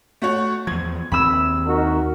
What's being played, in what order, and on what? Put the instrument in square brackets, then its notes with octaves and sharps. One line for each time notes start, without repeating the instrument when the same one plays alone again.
[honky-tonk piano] A3 F#4 C#5
[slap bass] E2 F3 [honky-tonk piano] G#6
[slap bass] D#2 C4 [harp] B5 E6
[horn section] D#4 F#4 A#4